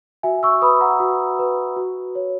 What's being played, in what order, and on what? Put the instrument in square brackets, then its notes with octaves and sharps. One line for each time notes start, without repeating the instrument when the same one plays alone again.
[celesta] F#4 E5 G#5
C#6 E6
B4 B5 D#6
F#5 A#5
F#4
B4
F#4
C#5